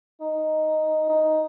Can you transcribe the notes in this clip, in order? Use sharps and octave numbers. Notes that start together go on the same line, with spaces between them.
D#4
D#4